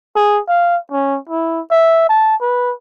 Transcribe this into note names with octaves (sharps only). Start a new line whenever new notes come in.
G#4
F5
C#4
E4
E5
A5
B4